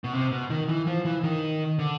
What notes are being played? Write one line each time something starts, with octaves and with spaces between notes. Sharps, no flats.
B2
C3
B2
D#3
E3
F3
E3
D#3
D3